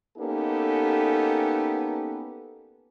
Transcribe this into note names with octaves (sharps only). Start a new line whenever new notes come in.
A#3 B3 C#4 D#4 G4 A4